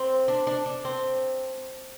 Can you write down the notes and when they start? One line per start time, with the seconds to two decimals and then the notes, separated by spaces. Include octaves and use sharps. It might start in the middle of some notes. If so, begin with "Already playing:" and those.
Already playing: C4
0.28 D4
0.47 D4
0.66 D4
0.85 C4